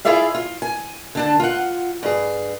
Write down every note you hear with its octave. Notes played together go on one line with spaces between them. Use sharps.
E4 F4 G#4 D5 E5 F5
F4
G#5
D3 D4 A5
F4 F#5
G2 G#4